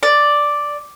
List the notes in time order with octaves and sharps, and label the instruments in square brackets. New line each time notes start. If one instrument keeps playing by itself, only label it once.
[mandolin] D5